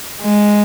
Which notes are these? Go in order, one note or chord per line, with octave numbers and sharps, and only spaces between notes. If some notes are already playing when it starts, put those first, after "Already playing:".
G#3